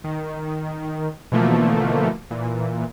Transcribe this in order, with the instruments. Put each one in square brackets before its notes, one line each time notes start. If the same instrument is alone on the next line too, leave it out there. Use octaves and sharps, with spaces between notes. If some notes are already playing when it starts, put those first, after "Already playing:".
[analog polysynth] D#3
B2 D3 E3 F3 A3 A#3
A#2 E3